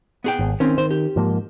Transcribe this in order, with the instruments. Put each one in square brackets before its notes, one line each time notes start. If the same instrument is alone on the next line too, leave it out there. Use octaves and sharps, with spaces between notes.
[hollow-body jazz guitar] B3 G#4 G5
[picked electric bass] G#1
[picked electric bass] D#3 [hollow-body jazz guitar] C4 C#4
[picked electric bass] D#3 [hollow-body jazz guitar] C5
[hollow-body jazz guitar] G4
[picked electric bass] G#2 F3 A#3